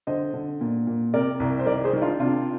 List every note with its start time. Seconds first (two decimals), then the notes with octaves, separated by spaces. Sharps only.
0.07 D3 C5 D#5
0.34 D3
0.61 A#2
0.87 A#2
1.14 C3 A#4 D5
1.40 C2
1.59 C5
1.66 D#3 A#4 D5
1.84 G#4 C5
1.93 D#3
2.01 D4 F4
2.20 C3 D4 F4